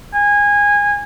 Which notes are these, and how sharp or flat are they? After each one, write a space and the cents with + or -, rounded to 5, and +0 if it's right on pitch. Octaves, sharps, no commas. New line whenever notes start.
G#5 -20